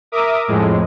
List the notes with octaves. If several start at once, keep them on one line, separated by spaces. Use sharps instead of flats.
A#4 E5 D6 D#6
F2 A2 G#3